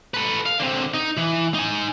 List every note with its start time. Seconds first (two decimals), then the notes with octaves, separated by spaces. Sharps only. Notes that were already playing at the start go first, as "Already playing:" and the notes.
0.14 A4 B4
0.46 F5
0.59 D3 C4
0.94 D#4
1.17 E3
1.54 D#4 G#5